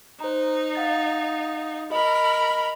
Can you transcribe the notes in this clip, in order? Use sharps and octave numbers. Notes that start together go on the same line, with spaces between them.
D#4 C5 A#5
F5 F#5 A6
A#4 D#5 B5